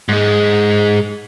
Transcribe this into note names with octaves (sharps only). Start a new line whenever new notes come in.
G#2 G#3